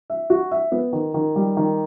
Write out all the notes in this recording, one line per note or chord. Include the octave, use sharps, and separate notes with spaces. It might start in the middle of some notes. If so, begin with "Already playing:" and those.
E5
F#4
E5
B3
D#3
D#3
G3
D#3